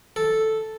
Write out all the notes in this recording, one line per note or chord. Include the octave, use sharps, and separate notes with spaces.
A4